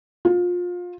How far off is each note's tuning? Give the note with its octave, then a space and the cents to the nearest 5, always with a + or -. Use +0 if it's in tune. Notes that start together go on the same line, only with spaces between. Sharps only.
F4 +25